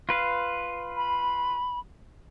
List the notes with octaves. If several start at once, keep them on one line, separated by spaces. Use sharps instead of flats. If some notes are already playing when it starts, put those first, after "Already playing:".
F4 B4 F5
B5